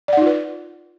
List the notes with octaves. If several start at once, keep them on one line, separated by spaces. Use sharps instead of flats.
D#4 F4 B4 D5 F#5